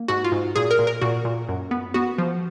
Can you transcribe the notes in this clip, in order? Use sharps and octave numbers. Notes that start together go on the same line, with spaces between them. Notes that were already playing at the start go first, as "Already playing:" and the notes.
Already playing: A#3
G#2 F#4
F4
G#2
A#2 G#4
A#4
A#2
A#4
A#2 F#4
A#2
F#2
B3
B3 F#4
F3